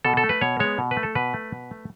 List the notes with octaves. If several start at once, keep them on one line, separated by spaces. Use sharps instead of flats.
B2 A4
A4
A3
B4
B2 C#5
G#3 B3 C#5
B2
B4
A3
A4
B2 B4
A3
B2
A3